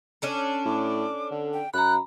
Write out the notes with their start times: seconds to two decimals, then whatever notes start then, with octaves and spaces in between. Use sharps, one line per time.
0.22 C#4 D4 A4
0.65 A2 D6
1.31 D3
1.54 G5
1.74 F#2 A#5 B5 F#6